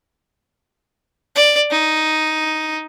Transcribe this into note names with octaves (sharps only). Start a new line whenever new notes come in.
D5
D#4